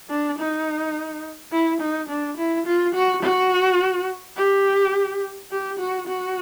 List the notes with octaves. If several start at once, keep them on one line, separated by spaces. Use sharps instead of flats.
D4
D#4
E4
D#4
D4
E4
F4
F#4
F#4
G4
G4
F#4
F#4